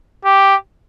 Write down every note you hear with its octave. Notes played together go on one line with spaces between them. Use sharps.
G4